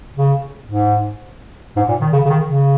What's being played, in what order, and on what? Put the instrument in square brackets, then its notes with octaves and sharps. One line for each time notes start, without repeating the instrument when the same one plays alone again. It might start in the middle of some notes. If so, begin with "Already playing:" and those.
[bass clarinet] C#3
G#2
G#2
A#2
D#3
C#3
C#3
D#3
C#3